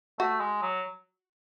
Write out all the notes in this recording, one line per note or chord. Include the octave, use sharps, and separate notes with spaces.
A3 F#4
G#3
F#3